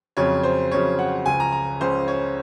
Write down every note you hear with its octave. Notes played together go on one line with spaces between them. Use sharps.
F2 C#3 F#3 C#4 C#5
C5
F2 C#3 F#3 C#4 C#5
F#5
C#2 C#3 F3 G#5
A#5
A#5
C#2 C#3 F3 C5
C#5